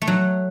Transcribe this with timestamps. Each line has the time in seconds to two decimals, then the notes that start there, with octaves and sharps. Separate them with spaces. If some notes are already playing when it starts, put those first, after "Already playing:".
0.02 A3
0.07 F#3